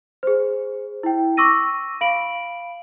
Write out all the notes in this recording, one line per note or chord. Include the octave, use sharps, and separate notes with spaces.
G#4 C5
E4 G5
C#6 D6 E6 A#6 D#7
F5 B5 D7 F#7